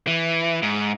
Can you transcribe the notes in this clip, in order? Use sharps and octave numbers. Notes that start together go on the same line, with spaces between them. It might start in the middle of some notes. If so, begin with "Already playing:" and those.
E3
G#2